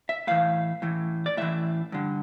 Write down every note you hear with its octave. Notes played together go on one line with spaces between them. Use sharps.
E5
A2 E3 F5
A2 E3
D5
A2 E3 E5
G2 D3